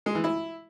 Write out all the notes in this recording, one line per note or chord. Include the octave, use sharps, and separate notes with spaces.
G#3
E3
E4